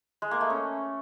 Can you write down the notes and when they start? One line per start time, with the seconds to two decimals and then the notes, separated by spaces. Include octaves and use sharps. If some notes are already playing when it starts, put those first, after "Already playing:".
0.22 G#3
0.31 A#3
0.41 A3
0.50 C#4